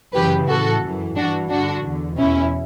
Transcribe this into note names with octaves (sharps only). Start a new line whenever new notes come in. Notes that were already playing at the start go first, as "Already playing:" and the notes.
F#2 C#3 E3 G4 B4
A2 E3 F#4 A4
F#2 E3
G2 E3 D4 F#4
G2 D3 D4 F#4
E2 D3
E2 B2 C#4 E4